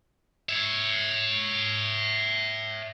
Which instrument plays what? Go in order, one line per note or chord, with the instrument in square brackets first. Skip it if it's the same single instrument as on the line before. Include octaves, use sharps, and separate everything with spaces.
[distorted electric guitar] C#5 E5